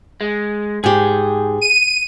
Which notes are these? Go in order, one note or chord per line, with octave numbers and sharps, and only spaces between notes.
G#3
G#2 G4 G#4
D#7